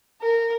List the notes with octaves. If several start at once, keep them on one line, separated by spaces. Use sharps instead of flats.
A#4